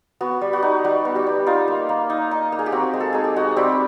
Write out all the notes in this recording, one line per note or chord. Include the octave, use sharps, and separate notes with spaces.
B3 F#4
G3
F#4
D#4
G3 F#4
B3
G3 G4
G3
D#4 F4
A#3
A#3
D#4
D#4
A#3
G#4
G4
C4 F#4
G#3
A4
D#4 G#4
G4
G#3 F#4
G3 C4 G4